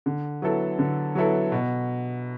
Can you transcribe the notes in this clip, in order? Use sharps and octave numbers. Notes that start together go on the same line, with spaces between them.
D3
F#3 B3 E4 A4
D3
F#3 B3 E4 A4
B2